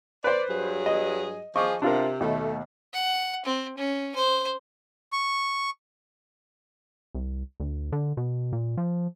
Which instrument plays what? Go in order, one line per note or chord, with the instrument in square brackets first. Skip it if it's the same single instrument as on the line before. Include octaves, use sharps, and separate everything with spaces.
[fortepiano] B4 C5 [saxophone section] D5
[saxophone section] G2 F#3 G#4
[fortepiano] D#5
[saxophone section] F3 G#4 [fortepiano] D#5 C#6 D6
[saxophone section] C3 [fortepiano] D4 F4 A#4
[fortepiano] D#2 B2 [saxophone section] A3
[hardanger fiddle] F#5
C4
C#4
C5
[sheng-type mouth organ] C#6
[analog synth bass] C2
D2
D3
B2
A#2
F3